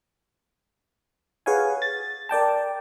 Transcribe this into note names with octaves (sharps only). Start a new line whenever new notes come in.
G#4 B4 C#5 F5 F#5 G#5
A6
A#4 D5 G5 A5